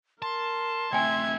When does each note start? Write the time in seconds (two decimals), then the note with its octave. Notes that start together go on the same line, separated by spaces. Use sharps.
0.22 A#4 A5 C6
0.93 A3 C4 E5 G5 G#5 G#6